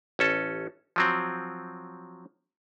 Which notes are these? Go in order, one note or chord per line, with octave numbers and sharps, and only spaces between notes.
A1 C#4 A4
F3 F#3 C4